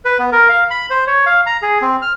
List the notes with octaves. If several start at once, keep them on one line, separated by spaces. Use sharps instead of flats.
B4
B3
A#4
F5
B5
C5
C#5
F5
A#5
G#4
C4
F6